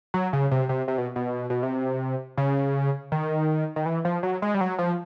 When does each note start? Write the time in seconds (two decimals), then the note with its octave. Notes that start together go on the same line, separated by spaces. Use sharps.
0.14 F#3
0.33 C#3
0.51 C3
0.69 C3
0.88 C3
0.98 B2
1.16 B2
1.50 B2
1.63 C3
2.38 C#3
3.12 D#3
3.76 D#3
3.86 E3
4.05 F3
4.23 F#3
4.42 G#3
4.54 G3
4.61 F#3
4.79 F3